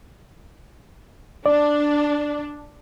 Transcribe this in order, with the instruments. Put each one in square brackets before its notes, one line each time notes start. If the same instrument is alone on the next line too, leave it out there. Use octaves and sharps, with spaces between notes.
[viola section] D4 [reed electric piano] D5